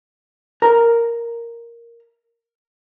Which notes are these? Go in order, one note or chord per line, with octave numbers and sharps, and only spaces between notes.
A#4 A#5